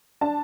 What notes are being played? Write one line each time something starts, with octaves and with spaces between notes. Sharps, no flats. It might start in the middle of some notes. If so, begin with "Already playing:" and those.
D4 A5